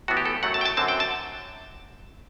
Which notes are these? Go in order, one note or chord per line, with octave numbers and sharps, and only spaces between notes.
A2 E3 B3 F#4
G4
A4
F#2 F#3 A3 F#5
A5
G5
A5
F#2 D3 F#3 C4 A5
G5
A5